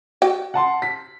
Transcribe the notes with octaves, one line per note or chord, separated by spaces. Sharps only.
F#4 G5
F#5 A5 C6
B6